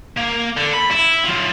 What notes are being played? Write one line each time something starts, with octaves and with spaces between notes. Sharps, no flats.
A#3
D3
B5
E4
F#3 F4